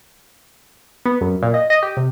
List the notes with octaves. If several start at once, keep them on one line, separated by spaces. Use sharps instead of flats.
B3
F#2
A#2
D#5
D#5
G4
C3